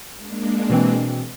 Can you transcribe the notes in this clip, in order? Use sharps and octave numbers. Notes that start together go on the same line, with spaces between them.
G#3 A#3 D4
B2 E3 C4